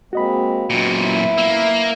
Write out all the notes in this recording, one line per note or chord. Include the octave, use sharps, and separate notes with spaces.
G#3 A#3 C4 F#4 D#5 B5
F#2 A#2 B3
E4
A#3 E6